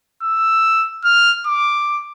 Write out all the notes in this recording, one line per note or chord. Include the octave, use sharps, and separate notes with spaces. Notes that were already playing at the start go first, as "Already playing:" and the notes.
E6
F6
D6